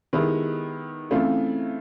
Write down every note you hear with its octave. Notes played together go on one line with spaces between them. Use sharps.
D#3 G#3 B3 E4 G4
C#3 E3 A3 C4 F4